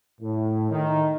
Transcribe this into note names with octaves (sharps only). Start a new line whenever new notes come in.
A2
D#3